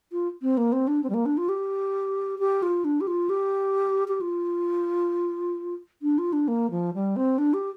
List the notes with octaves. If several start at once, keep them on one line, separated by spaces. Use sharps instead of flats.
F4
C4
A#3
C4
D4
C4
G3
A#3
D4
F4
G4
G4
F4
D4
G4
F4
G4
G4
F4
D4
F4
D4
A#3
F3
G3
C4
D4
G4